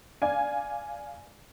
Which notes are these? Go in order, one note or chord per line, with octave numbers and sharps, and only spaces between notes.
D5 F5 G#5